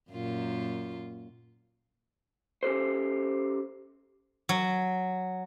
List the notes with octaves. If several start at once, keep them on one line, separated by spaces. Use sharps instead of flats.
F#2 A#2 F4
C#4 G4 A4 C5
F#3